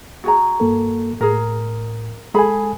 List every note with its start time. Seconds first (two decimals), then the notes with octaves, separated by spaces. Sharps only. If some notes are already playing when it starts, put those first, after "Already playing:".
0.24 F#4 G#4 A#5
0.60 G2 A#3 A4
1.21 A2 G#4 A#4
2.34 G#3 G#4 A4 G#5 B5